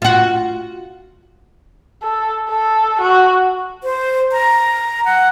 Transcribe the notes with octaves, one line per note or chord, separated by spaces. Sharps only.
F4 F#4
A4
A4
F#4
C5
A#5
F#5